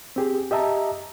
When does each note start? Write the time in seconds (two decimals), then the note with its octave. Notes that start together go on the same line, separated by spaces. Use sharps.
0.16 C4 G4 G#4
0.51 G4 D#5 E5 A5 A#5